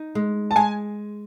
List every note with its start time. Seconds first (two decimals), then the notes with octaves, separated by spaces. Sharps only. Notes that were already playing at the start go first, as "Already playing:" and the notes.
Already playing: D#4
0.15 G#3
0.51 A5
0.56 G#3 G#5